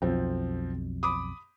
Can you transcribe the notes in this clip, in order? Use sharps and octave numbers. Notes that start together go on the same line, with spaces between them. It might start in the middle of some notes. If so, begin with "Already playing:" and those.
B1 F2 F3 C4
B5 D6 D#6